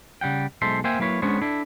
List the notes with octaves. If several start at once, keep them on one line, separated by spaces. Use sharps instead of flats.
C#3 G3 F#5 G5
B1 G#3 A4 C5 E5 C6
A#3 C5 E5 G5 G#5
F#3 A#3 E4 B4 C#5
G#3 B3 C#4 D4 C5 C#5
D4 E4 A4